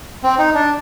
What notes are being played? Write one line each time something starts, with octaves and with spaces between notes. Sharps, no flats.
C4
D#4
D4